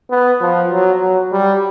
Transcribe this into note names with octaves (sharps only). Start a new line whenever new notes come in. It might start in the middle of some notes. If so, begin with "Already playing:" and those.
B3
F3
F#3
F#3
G3